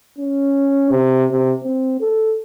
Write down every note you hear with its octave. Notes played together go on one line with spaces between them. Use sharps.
C#4
C3
C3
C4
A4